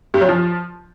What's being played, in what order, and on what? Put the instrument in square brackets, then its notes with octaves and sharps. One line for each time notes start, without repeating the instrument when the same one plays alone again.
[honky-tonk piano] G2
F#3
F3